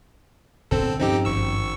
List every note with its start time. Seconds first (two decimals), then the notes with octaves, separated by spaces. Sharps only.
0.71 D1 B1 D3 C4 A4
0.99 G2 F3 C4 C#4 D#4 G4
1.25 G#1 C#6 E6